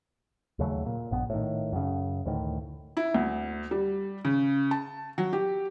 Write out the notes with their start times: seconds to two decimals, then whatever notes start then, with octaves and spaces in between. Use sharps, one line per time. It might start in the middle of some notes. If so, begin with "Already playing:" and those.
0.59 D#2 C#3 F#3 A3
0.86 A#2
1.11 A#1 G2 B3
1.30 A2 D#3
1.73 F#2 C#3
2.25 D2 A2 D#3
2.97 E4
3.14 D2
3.71 G3
4.25 C#3
4.71 A5
5.18 F#3
5.33 G4